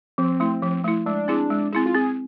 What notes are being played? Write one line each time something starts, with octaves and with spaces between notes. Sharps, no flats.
F3 C4
A3 E4
F3
A3 E4
G#3 D4
C4 E4 G#4
G#3
C4 E4 G#4
F4
C4 G#4